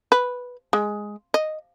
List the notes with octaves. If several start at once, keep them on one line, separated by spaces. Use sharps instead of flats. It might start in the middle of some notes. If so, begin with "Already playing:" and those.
B4
G#3
D#5